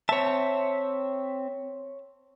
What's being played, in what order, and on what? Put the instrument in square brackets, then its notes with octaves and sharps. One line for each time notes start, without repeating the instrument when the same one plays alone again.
[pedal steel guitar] C4 E5 [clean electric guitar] C#5 A5